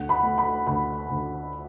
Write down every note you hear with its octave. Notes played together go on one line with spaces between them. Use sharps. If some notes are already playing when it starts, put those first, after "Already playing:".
Already playing: D2 F#5
B5
A3
B5
D2 B5
D2